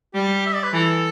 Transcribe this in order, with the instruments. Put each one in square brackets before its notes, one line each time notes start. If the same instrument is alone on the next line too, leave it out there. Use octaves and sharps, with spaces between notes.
[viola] G3 [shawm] G4
[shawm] E5
D5
B4
[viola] E3 [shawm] A4